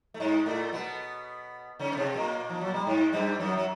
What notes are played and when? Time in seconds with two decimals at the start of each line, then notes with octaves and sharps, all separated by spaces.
0.14 A3
0.20 G#2 G#3
0.46 A2 A3
0.73 B2 B3
1.79 C#3 C#4
1.92 B3
1.97 C3 C4
2.15 A#2 A#3
2.50 F3
2.61 F#3
2.74 G3
2.87 G#2 G#3
3.13 G2 G3
3.39 F#2 F#3
3.57 F#3